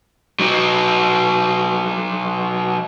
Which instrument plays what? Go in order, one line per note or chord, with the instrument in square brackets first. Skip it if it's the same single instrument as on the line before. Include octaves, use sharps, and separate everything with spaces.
[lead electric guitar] F#3 D#4